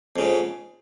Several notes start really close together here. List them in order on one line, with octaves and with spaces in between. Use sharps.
F2 C#3 G#2